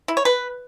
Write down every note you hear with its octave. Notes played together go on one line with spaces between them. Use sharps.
E4
C#5
B4